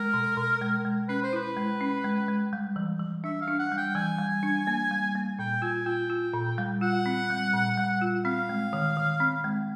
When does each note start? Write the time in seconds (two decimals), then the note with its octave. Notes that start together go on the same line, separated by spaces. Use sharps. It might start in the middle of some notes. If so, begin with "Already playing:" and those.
Already playing: G#3 A#4
0.14 B2
0.37 B2
0.61 G#3
0.85 G#3
1.08 C#4 B4
1.23 C5
1.33 E4 B4
1.57 G#3
1.81 C#4
2.04 G#3
2.28 G#3
2.53 G3
2.76 E3
2.99 E3
3.24 D4 E5
3.41 F5
3.48 D4
3.59 F#5
3.72 G3
3.77 G5
3.95 E3 G#5
4.19 G3
4.43 D4
4.67 A#3
4.91 G3
5.15 A#3
5.39 A#2 G5
5.62 F4 G#5
5.86 F4 G5
6.10 F4
6.34 A#2
6.58 G3
6.81 F4 F#5
7.06 C4
7.30 G3
7.54 A#2
7.77 G3
8.01 F4
8.25 C4 F5
8.49 G#3
8.73 D#3
8.97 D#3
9.20 C4
9.44 G#3